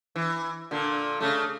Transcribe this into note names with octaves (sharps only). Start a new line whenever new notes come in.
E3
A#2 D3
C#3 A3